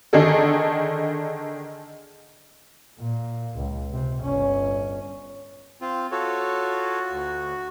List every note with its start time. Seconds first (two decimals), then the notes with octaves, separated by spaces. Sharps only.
0.13 D3 D#3 D4 G#4 A4
2.99 A#2
3.57 C#2
3.92 C3
4.23 G1 C#4
5.81 C4 F4
6.11 F4 F#4 A4 C#5
7.10 D2